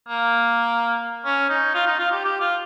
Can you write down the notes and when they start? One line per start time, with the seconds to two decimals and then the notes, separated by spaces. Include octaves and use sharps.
0.08 A#3
1.25 C#4
1.49 D#4
1.75 F4
1.86 D#4
1.99 F4
2.12 G4
2.24 G4
2.41 F4